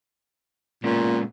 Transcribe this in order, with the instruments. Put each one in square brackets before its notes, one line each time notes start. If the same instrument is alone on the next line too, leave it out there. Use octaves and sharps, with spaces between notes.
[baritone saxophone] A#2 [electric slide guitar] G#3 B3 C#4